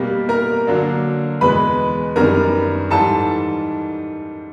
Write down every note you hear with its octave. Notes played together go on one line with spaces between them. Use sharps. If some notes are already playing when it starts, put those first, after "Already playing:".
Already playing: B2 G3 A#3 G4
A#4 A#5
D3 F#3 A#3 D4
E2 B2 G#3 B4 B5
F#2 D#3 G3 B3 D4 A#4 A#5
G#2 E3 G3 A4 A5